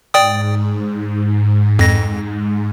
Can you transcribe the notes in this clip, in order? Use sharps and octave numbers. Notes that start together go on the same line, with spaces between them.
G#2 D5 G5 D#6
F2 A#6